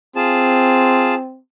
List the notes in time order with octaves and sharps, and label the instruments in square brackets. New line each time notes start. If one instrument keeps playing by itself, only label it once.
[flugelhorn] C4 [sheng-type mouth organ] F4 G#4 A5